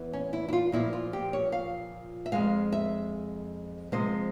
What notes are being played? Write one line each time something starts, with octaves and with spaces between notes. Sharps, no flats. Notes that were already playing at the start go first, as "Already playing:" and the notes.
Already playing: E2 E3
C#4
E4
E4
F4
A#2 F3 A#3 E4
F4
G4
C#5
F5
E5
F2 E3 G#3 F5
E5
C3 F3 G#3 C5